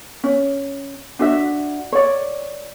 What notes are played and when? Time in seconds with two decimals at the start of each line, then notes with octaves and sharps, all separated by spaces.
0.24 C#4
1.19 D4 F#4 E5
1.92 C#5 D5